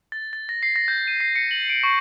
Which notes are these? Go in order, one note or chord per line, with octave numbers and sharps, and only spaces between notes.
A6
A6
A#6
C7
A#6
G6
D#7
C7
C#7
F#7
D7
C#6